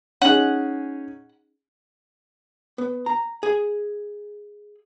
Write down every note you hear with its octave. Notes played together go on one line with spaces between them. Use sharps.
C#4 D#4 G#4 F#5
B3
A#5
G#4